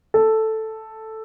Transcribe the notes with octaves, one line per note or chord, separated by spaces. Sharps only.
A4